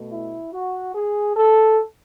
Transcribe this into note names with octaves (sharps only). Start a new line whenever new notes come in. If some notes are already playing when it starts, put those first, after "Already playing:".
Already playing: B2 A3
E4
F#4
G#4
A4